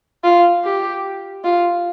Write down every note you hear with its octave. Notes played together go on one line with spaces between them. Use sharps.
F4
G4
F4